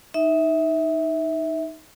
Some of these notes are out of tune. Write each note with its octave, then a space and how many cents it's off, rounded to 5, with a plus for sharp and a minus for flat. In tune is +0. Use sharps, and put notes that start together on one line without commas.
D#4 +0 E5 -15